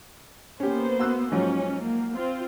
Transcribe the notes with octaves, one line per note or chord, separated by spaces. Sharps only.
A#3 B3 C#4 G4 C5
F#4 E6 F#6
G#2 F3 F#3 C#4
A#3
C4 F4